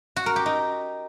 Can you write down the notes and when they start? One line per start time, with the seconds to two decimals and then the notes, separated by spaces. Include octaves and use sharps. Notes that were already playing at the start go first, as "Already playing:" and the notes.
0.16 F#4
0.26 A#4
0.36 G4
0.46 D#4